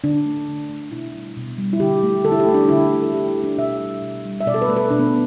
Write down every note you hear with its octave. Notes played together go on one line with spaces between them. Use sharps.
D3 D4
A3
D3
A3
B2 E4
G3
B2
G3
E4
D3 G4
A3
D3 A4
E4
G4
A3
D4
D3 E4
A3
A4
D3 G4
E4
A3
D4
B2 E5
G3
B2
G3
E5
B2 D5
A4
B4
A3
B4
B2 D4
B3